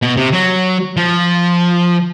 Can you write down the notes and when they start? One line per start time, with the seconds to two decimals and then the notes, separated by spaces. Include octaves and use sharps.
0.02 B2
0.17 C3
0.32 F#3
0.97 F3